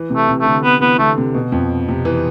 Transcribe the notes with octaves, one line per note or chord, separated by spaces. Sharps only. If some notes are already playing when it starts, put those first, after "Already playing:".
Already playing: E3
C3
A3
C3
A3
D3
D3 B3
E3 B3
D3 A3
C3
B2
F2
C3
E3